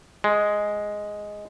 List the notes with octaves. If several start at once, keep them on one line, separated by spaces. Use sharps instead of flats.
G#3